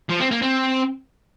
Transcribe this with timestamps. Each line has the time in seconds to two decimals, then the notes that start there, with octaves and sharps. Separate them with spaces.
0.10 F3
0.20 C4
0.31 A#3
0.42 C4